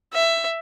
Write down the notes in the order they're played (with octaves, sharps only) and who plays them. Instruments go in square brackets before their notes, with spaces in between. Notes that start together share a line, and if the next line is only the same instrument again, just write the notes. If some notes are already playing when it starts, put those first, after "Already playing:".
[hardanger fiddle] E5